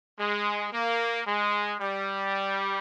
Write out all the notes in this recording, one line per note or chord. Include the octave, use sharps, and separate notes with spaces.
G#3
A#3
G#3
G3